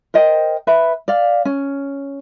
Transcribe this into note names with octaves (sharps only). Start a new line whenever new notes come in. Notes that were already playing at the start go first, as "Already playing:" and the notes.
A#4 C5 D#5 G5
B4 E5 B5
D5 F5
C#4